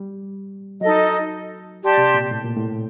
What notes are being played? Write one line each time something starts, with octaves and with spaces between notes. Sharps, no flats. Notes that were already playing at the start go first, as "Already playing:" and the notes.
Already playing: G3
F#3 D#4 A4 D#5
G4 D5 A5 C6
C3
A#2
A2
A#2
A2